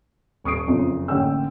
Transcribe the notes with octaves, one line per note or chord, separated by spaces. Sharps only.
D#1 C#6 D#6 C7 D7
F#1 F2 C#4 F4
A1 D3 A#3 C#4 G5 E6